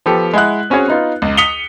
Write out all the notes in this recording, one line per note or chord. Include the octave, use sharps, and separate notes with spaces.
F3 B3 G4 A4
G#3 E4 F#5 F#6
C4 C#4 F#4 G#4 C#5
B3 D#4 F4
C#2
D#6 B6 C#7 F7 G7